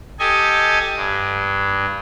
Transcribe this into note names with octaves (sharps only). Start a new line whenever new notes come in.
G4 A4 D#5 G#5
G2